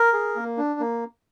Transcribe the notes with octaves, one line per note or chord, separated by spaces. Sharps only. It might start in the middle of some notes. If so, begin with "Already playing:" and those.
Already playing: A#4
G#4
A#3
D4
A#3